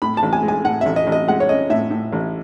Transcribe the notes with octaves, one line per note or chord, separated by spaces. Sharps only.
A2 B5
A5
A1
G#5
G#3
G#5
A2 F#5
A1 E5
D#5
A1
D#5
G#3 F#5
C#5
C#4 D#5
A2 E5
A2
A1